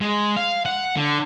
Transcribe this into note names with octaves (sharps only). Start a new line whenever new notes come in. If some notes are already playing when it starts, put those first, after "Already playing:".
G#3
F5
F#5
D3